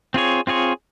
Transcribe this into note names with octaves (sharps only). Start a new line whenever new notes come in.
C4 F4 G#4 C#5
C4 F4 G#4 C#5